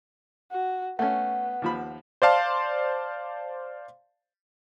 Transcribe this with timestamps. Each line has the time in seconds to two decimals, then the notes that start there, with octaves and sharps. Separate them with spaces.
0.51 F#4
0.99 A3 B3 C#4 F#5
1.62 D#2 F3 B5
2.22 C5 D5 F5 A5 C6